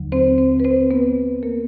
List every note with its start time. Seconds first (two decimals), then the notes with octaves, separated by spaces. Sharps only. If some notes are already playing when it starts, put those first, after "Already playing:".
Already playing: D#2 D3 F#3
0.12 C4 C5
0.38 C4 C5
0.60 B4
0.65 C4 C5
0.91 B3 B4
1.43 A#3 A#4